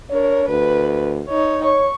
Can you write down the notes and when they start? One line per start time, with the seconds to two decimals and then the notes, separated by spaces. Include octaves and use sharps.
0.10 D4 A#4 C#5
0.49 D2 B4
1.29 D#4 C#5
1.65 C#5 C#6